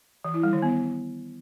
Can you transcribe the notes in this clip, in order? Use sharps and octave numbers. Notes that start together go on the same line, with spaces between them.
E3
E4
G3
D#3
B3